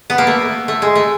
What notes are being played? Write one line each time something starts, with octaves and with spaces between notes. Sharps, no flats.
B3
A#3
A3
A3
G#3
A3